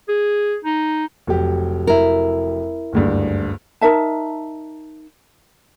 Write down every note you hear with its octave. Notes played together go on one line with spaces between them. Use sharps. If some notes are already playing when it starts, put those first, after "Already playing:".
G#4
D#4
F1 F#3 G4
E4 A#4
F#1 D2 G2
D#4 A#4 E5 A5